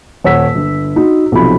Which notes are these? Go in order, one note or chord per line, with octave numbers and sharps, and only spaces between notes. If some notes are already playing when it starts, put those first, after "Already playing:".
D#1 C#5 F#5 E6 B6
G1
D#4 F#4
B1 C3 F3 B5